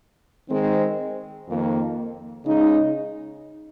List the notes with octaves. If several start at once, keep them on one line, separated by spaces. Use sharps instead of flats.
D#3 G#3 C4
F2 D#3 A#3
C#3 G#3 D#4